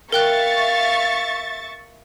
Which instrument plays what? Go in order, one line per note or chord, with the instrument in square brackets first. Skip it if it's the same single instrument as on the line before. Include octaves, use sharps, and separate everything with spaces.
[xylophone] A#4 G5 F#6 [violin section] E5 C#6 A6 [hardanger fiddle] F5